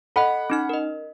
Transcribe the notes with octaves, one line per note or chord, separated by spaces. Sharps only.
A4 D#5 F#5 B5
C#4 D#4 F6
A#4 D#5